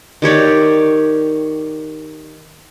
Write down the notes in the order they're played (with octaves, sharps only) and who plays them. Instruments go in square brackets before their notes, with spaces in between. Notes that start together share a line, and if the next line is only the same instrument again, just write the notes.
[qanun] D#3 G4 C#5 D5